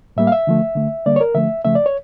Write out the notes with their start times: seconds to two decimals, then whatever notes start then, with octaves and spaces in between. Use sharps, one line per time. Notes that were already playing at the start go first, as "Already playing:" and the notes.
0.17 A2 G3 A#3 E5
0.27 F5
0.32 E5
0.47 D3 F3 A3
0.75 D3 A3
1.06 D3 G3 A#3 D5
1.16 C#5
1.21 A#4
1.35 D3 F3 A3 E5
1.64 C#3 F3 A3 E5
1.75 D5
1.86 C#5